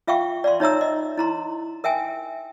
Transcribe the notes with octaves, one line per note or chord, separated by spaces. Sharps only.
F4 E5 F5 G5 C#6
D5 F5 C6
D#4 C#5 E5 A#5 E6
D#5
E4 A#5 C6
A#4 E5 G5 G#5